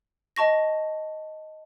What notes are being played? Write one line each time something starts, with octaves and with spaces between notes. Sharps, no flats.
D#5 A5 C#6 A#6